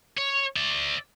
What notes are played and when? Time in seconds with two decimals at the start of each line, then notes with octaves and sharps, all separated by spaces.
0.18 C#5
0.57 D5 E5